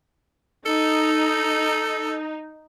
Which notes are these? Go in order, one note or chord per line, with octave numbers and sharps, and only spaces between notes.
D#4 A4